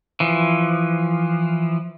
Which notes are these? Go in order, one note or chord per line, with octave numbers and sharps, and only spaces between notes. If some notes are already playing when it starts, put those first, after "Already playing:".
E3 F3